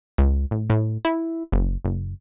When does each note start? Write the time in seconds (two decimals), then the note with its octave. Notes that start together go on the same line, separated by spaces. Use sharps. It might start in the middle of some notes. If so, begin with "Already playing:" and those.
0.18 C#2
0.51 A1
0.70 A2
1.05 E4
1.52 F#1
1.85 F#1